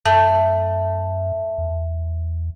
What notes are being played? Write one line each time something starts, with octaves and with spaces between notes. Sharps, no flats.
F#2 A3
E2